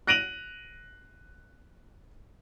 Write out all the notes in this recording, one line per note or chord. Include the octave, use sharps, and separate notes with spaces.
F#6 A#6 D7 D#7 F7 F#7